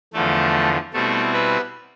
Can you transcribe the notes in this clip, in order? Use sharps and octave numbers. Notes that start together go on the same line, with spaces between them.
E2 D3 F3 A3 A4
B2 G3 A3 C4 E4 A4
B3 B4